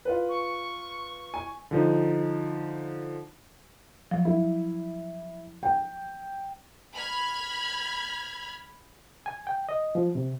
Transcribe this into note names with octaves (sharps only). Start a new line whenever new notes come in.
F4 B4
C#6
G#5
D3 F3 D#4
F3 F#3
E4
G5
B5 F6 G#6
G#5
G5
D#5
F3
C3